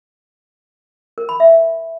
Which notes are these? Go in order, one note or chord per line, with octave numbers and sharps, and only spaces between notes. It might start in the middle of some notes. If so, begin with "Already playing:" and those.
A#4
B5
E5